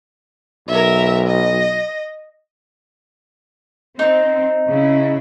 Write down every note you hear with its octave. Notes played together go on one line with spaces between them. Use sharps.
B1 A#4 E5
D#5
C4 D#4
C#3 E4